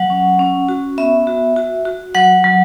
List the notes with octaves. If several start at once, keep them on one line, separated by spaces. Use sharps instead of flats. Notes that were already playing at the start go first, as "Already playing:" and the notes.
Already playing: F#3 F#5
C#4
C#4
F#4
B3 E5
F#4
F#4
F#4
F#3 F#5
F#3